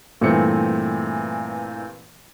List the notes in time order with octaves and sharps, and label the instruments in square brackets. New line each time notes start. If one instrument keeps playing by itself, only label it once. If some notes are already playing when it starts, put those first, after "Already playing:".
[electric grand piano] G2 A#2 E3 A3 C4 C#7